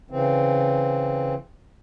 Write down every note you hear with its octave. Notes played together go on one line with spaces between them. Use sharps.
C#3 E3 C4